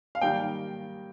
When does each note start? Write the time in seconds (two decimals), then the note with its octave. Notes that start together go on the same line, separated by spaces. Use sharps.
0.15 F5
0.21 D#3 G3 A#3 G5